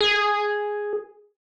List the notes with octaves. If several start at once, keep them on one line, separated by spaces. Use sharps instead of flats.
G#4